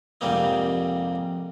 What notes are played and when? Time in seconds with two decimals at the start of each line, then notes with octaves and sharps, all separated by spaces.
0.21 F2 G#2 C3 G3 A#3 D#4